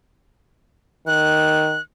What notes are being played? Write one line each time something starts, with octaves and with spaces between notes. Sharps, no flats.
D#3 F#6